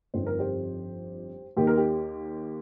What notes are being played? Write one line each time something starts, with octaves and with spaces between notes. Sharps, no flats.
G1 F2 F3 C4 D#4 C5
A#4
G4 C5
D#2 D#3 A#3 D#4 G4
A#4
G4